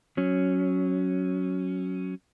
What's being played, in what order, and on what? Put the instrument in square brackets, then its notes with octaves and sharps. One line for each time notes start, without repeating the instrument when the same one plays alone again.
[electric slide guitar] F#3 C#4